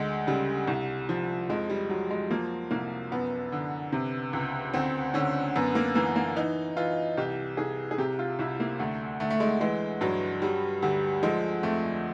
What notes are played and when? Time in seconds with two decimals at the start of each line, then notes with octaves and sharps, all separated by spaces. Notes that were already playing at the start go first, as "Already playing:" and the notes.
Already playing: D2 G#3
0.27 C#3 G3
0.68 C2
1.09 F3
1.49 F2 G#3
1.70 G3
1.89 F#3
2.11 G#3
2.31 F3 A#3
2.71 C2 A#3
3.12 F#2 B3
3.52 D3
3.92 C3
4.33 C#2
4.74 D2 C4
5.14 D3 C#4
5.56 F#2 B3
5.75 A#3
5.95 E3 A#3
6.16 A#3
6.36 E3 D#4
6.77 E3 F4
7.18 C2 G4
7.57 C2 G#4
7.91 G#4
7.98 C3 G4
8.19 F4
8.39 C2 E4
8.60 A#3
8.79 D2 A3
9.20 D2 A3
9.30 A3
9.40 G#3
9.61 E3 G#3
10.01 G2 F#3
10.42 F#3 G3
10.82 D2 G3
11.23 F3 G#3
11.63 F2 A3